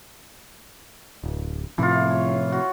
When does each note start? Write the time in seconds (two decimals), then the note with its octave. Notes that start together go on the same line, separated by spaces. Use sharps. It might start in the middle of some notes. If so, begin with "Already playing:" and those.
1.24 D1
1.78 A2 C3 E3 F3 F4
2.10 C#5
2.52 F#4